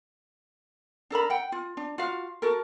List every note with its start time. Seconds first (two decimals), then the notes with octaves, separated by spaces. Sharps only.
1.10 D4 A4 A#4 B5
1.30 F#5 G5
1.52 F4
1.77 D4
1.98 F4 F#4 F5
2.42 F#4 A4 A#4